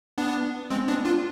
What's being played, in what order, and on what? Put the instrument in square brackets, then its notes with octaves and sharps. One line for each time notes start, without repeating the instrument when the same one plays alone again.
[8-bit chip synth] B3 D4
G#3 C4
B3 D4
D4 F4